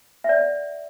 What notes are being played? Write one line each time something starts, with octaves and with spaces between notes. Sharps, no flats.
D5 E5 F#5